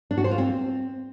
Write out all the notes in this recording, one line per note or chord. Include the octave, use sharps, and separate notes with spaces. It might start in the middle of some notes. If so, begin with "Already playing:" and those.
D4
F#4
C5
F4
C4